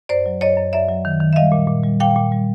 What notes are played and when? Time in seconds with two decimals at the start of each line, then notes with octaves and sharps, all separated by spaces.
0.09 F#2 C5 D5
0.26 F#3
0.41 F#2 C#5 D#5
0.57 F#2
0.73 F#2 D5 E5
0.88 F#3
1.05 D#3
1.20 D#3
1.33 E5
1.36 G3 D#5 F5
1.52 A#2
1.68 A#2
1.83 G3
2.00 A#2 F5 G5
2.16 A#2
2.32 G3